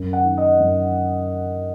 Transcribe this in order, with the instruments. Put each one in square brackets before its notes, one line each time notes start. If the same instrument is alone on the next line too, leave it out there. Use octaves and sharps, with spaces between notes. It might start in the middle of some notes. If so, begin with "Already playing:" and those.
Already playing: [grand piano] F#2
F#5
D#3
D#5
F#2